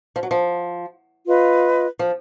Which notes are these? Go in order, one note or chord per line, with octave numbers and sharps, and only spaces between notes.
F3
F#3
F3
F4 B4 D#5
F3